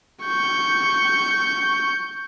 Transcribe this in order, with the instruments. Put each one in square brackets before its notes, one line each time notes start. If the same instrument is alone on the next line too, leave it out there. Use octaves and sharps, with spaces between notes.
[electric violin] C#6 G6